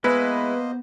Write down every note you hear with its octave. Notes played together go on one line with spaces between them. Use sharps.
G#3 A#3 B3 E4 B4 C5 D#5